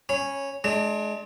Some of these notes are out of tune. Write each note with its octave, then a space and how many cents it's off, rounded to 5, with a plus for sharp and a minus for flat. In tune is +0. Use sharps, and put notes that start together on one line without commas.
C#4 -5 B5 +0
G#3 +35 D4 +10 A#5 -45